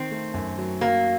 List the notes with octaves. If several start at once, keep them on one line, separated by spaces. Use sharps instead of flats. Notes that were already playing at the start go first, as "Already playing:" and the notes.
Already playing: D#3 C4
A3
F#2
F#3
F#3 A#3